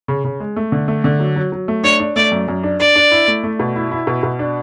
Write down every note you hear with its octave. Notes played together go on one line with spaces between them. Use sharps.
C#3
C#3
G#3
A3
D3
A3
D3
F#3
F#3
F#3
A3
D4 C#5
D4
A3 D5
F#2
F#2
D4
D4 D5
D4
E4
A3
A3
B2
E4
E4
B2
B2
D4